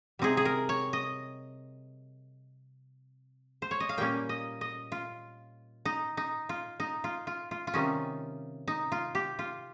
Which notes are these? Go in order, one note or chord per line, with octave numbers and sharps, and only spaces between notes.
C3 G3 C4 D#4 G#4
G#4
A#4
C#5
D#5
C5
C#5
D#5
F5
A#2 G3 A#3 C#4 G5
D#5
D#5
F4
D#4
D#4
F4
D#4
F4
F4
F4
F4
C3 D#3 G3 C#4 D#4
D#4
F4
G4
F4